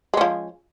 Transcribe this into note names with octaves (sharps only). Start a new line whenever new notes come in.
F3 G#3 C#4